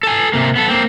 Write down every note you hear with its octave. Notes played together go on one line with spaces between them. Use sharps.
A4 G#5
C3 A#3
B3 A4
A#3 C4